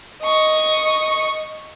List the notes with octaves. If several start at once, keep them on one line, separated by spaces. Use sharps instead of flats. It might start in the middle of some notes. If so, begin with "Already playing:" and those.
D#5 C#6